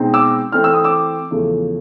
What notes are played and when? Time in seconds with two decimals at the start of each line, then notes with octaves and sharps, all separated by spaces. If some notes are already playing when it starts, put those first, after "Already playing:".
Already playing: B2 G#3 C4 D#4
0.14 D6 E6
0.52 E3 A3 C4 F6
0.64 E6
0.73 D#6
0.84 D6 E6
1.30 E2 C#3 F3 A3